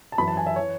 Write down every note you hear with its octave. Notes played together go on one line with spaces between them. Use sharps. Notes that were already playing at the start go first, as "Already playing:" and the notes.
A5
F#2 E3 B5
A5
G#5
E5
E3 C#5